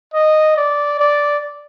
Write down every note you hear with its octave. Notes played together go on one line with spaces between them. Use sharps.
D#5
D5
D5